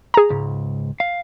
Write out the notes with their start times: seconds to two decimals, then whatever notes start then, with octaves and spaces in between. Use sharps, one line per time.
0.14 G#4 A#5
0.30 C#2 G#2
1.00 F5